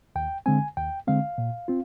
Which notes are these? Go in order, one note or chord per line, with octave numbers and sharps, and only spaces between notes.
D#2 G5
D3 G#3 C4 G#5
D#2 G5
D3 G#3 C4 F5
A#2
C4 F4